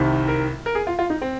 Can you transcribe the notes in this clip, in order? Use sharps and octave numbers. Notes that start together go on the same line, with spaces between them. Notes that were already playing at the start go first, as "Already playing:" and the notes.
Already playing: C2 C3 D#3
A#4
A#4
G#4
F4
F4
D#4
C4